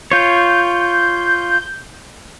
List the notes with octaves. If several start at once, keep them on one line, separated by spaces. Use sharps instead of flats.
F4 C#5 G6